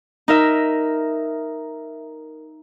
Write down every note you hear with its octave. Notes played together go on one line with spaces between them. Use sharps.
D#4 A#4 E5